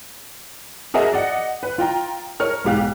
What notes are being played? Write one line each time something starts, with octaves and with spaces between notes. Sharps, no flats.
F#4 G#4 A#4 D#5 E5
D5 D#5 F#5
B4
F4 G5 A#5
A#4 C#5 F6
B1 G#2 G4 F5 F#6